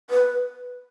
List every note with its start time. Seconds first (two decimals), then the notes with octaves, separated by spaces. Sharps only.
0.10 B4